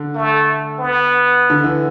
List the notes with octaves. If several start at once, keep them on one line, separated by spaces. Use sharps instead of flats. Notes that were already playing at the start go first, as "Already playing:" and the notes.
Already playing: D3
A3
B3
D3
E3